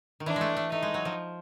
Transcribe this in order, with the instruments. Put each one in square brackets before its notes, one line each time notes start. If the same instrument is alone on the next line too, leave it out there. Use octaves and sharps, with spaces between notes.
[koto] D#3
[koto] E3 [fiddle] D4
[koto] G#3
A3
A3
[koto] A3 [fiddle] D#4
[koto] G#3
F#3
F3